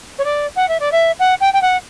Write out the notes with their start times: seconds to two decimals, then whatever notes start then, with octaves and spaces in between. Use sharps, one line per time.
0.18 C#5
0.24 D5
0.56 F#5
0.68 E5
0.80 D5
0.92 E5
1.19 F#5
1.40 G5
1.53 G5
1.62 F#5